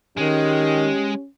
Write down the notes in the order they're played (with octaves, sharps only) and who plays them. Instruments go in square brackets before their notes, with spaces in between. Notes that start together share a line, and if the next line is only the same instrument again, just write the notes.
[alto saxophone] D#3 [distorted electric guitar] G#3 [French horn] C#4 [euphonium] G4